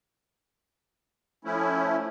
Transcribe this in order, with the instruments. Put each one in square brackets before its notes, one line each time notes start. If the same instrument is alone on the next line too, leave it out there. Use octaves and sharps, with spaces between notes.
[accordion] F3 A3 C#4 E4